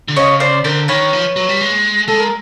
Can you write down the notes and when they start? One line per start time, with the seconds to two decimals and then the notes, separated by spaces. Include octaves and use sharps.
0.08 D3
0.16 C#3 C#5 D#5
0.40 C5 D5
0.64 D3 A#4 C5
0.88 D#3 B4 C#5
1.13 F3
1.36 F#3
1.49 G3
1.61 G#3
2.08 G#3 A4
2.20 A#4